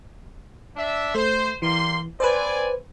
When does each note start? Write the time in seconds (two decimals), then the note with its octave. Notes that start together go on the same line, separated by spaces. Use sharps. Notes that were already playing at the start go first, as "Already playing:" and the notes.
0.76 D4 E5
1.15 A3 C5
1.62 E3 G3 A#3 C6
2.20 C4 B4 C5 D5 G#5